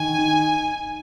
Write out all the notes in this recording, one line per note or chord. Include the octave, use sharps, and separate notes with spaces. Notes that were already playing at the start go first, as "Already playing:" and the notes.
Already playing: D#3 G#5
D#4